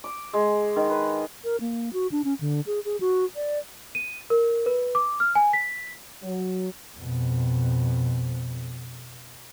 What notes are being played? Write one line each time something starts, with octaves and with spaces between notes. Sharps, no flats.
D6
G#3
D#3
B4
A#4
A#3
F#4
D4
C#4
D3
G#4
G#4
F#4
D5
D#7
A#4
B4
D6
F6
G#5
B6
F#3
F2 B2